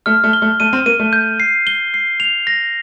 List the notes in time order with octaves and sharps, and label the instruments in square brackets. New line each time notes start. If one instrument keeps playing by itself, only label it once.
[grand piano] A3 [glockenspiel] F6
[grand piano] A3
[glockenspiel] G7
[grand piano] A3
[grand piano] A3 [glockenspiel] D#7
[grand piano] C4
[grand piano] A#3 [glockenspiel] D#7
[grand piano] A3
[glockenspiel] G6
C7
G7
C7
F7
A#6